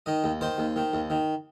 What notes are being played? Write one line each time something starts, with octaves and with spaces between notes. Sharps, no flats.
D#3 D#5
D#2
D#3 C5
D#2
D#3
D#2
D#3